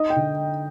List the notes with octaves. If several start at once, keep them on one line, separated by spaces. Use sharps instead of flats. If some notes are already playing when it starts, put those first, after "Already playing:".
Already playing: D#4 D#5
G5
D3